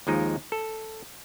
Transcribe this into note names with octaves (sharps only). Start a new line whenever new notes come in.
D#2 F3 G#3 D#4
A4